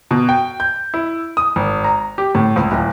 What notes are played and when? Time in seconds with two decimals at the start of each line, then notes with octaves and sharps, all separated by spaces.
0.11 B2
0.29 G5
0.60 G6
0.94 E4
1.37 D#6
1.56 G#1
1.84 A#5
2.18 G4
2.35 A2
2.56 C#2
2.72 D1